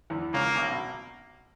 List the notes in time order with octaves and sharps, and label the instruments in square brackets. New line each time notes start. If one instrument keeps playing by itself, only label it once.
[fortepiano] E2 E3
[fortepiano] C#2 C#3 [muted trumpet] A#3
[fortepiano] B1 B2
B2